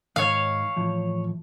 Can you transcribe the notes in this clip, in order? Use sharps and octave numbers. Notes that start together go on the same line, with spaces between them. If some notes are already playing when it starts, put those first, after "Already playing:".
G#2 D#3 C#5 F5
A2 E3 F3